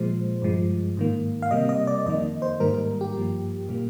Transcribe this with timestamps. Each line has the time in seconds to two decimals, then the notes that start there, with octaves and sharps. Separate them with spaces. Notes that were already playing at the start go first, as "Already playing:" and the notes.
Already playing: A#2 F3 G#3 C5
0.42 G2 F3 G#3
0.97 G#2 D#3 A#3
1.42 F5
1.51 C3 G3 A#3 D#5
1.69 D#5
1.87 D5
2.06 F2 D#3 A#3 D#5
2.42 C5
2.60 G#2 D#3 G3 A#3 A#4
2.74 A#4
3.01 G4
3.15 G2 F3 A#3
3.69 A#2 G3 A#3